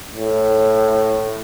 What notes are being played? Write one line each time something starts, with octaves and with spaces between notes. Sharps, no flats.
A2